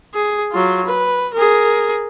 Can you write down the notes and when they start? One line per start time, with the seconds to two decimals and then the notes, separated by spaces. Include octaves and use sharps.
0.14 G#4
0.52 F#3 F4
0.85 B4
1.34 G#4 A#4